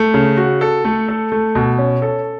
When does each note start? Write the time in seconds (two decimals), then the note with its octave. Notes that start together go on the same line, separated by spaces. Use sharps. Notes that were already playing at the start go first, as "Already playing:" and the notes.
Already playing: A3
0.14 C#3
0.37 F#4
0.61 A4
0.85 A3
1.08 A4
1.32 A3
1.55 B2
1.78 C#4
2.02 A4